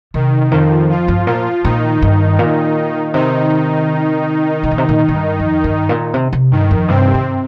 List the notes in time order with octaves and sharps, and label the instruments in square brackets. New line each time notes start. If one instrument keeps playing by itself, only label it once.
[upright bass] C3 [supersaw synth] D#3
[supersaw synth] F2 F3 [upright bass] D#3
[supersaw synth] F3 F4
[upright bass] G2
[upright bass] A#2 [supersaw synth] F3 F4
[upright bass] A#2 [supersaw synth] D#3 D#4
[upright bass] G2
A#2
[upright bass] C3 [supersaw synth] D#3 D#4
[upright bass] C3
A#2
C3
A#2
A#2
G2
F2
G2
A#2
C3
C3
[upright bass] G2 [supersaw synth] D#3
[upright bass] F2
[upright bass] G2 [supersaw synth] C3 C4
[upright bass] G2